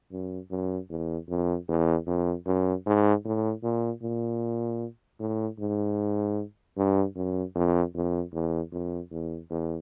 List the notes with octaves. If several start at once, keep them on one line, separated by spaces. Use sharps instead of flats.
F#2
F#2
E2
F2
E2
F2
F#2
G#2
A2
A#2
A#2
A2
G#2
G2
F#2
F2
F2
E2
F2
E2
E2